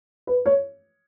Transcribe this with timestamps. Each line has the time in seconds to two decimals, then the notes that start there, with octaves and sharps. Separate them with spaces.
0.27 B4
0.46 C#5